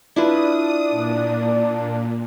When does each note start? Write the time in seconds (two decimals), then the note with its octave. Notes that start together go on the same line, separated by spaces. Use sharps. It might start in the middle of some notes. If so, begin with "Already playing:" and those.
0.16 D4 E4 F4 B4 D#6
0.90 A#2